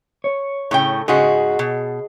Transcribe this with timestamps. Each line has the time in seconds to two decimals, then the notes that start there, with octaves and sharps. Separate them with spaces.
0.24 C#5
0.71 A2 C#3 G5
1.08 G#2 C#3 F#4 G#4 D#5 G#5
1.59 B2